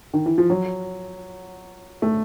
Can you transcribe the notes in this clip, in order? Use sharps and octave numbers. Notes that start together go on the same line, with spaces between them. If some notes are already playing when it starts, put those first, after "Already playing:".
D#3
E3
F3
F#3
A3